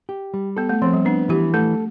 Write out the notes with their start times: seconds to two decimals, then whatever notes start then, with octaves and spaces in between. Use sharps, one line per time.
0.09 G4
0.34 G3
0.57 B3 A4
0.69 A3
0.82 F3 C4
0.93 G3
1.05 B3 D4
1.29 E3 G4
1.54 A3 A4